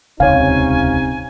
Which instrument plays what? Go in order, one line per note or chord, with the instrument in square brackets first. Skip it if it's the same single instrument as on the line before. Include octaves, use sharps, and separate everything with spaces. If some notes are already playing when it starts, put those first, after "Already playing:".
[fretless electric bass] D#1 C#2 [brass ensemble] C3 C#4 D#4 [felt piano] C#5 F5 [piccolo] G#5